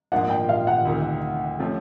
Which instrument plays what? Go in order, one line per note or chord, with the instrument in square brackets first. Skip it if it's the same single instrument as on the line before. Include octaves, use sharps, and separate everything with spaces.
[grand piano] G#2 F3 A#3 D4 [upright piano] F#5
[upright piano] G5
F5
F#5
[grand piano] D2 C3 D#3
C3 F3 A3 C#4